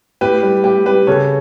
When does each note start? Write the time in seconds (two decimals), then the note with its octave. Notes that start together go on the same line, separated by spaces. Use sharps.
0.21 A2 G4 B4
0.43 G3
0.64 A2 G4
0.86 G3 G4 B4
1.07 C#3 A4 C#5